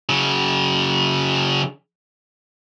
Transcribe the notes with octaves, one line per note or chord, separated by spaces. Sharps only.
C#3 F#3